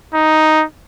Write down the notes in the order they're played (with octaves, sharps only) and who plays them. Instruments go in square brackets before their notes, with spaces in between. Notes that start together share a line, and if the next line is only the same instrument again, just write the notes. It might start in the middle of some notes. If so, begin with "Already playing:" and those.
[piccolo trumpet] D#4